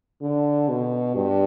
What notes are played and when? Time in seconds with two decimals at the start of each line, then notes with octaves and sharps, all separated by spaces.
0.22 D3
0.69 B2
1.15 G2